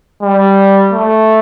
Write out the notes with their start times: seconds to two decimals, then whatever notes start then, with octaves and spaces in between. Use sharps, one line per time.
0.22 G3
0.93 A3